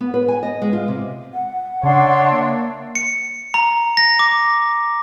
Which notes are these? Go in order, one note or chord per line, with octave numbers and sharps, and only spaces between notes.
B3
B4
G#5
D#5
G#3
F4
C3
F#5
C#3 D4 C#5 E5 C6
A#3
C#7
A#5
A#6
D6